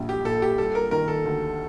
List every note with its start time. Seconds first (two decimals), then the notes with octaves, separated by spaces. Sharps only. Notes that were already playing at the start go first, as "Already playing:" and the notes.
Already playing: A#1 G3
0.09 G4
0.25 A#2 A4
0.42 G4
0.58 G3 A4
0.75 A#4
0.91 D#3 A#4
1.08 A4
1.25 D2